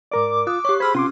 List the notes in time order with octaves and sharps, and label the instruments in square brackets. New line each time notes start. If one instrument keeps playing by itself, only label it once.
[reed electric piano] G#2 A#4 D5 [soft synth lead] D6
[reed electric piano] F4 [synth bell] D#6 F#6
[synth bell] G4 C#6 [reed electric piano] C#5
[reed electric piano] G#4 C5 [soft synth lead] B5 [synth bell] E6 F6 G#6
[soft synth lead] C3 [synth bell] C#4 [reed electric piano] F4 C6 D6